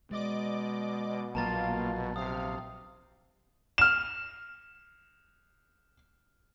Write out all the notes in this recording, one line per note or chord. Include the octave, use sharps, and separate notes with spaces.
B2 G#3 D5 D#5 D6
A#1 F#3 A#3 F4 F5 A5 A#5 A6
C3 F5 D#6
F6 E7